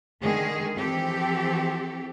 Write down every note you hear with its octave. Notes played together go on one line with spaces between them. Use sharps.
D3 D#3 G#3 G#4
E3 F3 C4 G4 A4